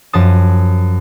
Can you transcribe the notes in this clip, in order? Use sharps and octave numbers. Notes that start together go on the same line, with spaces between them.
F#2 F3 A5 D#6